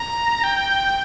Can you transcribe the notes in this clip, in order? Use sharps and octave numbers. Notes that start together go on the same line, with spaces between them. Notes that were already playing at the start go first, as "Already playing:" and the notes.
Already playing: A#5
G5